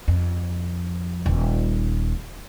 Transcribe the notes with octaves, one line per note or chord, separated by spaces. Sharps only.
F2
D#1